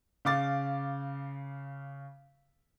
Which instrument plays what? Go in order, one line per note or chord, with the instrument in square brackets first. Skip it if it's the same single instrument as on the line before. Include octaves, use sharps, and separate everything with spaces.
[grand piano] C#3 F5 D6 A6